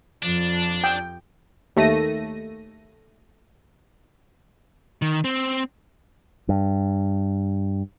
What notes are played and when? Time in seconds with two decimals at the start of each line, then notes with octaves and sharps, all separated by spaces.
0.23 F2 F3 D4
0.84 G5
1.76 D#2 A3 A#6 D#7
5.02 D#3
5.24 C4
6.49 G2